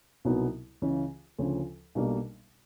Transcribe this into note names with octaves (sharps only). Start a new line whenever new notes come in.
C2 B2 F#3 B3 D#4
C#2 C#3 E3
D2 C#3 F3
B1 B2 G3 A#3 D4